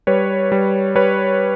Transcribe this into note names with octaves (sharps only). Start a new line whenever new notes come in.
G3 B4 C#5
G3
G3 B4 C#5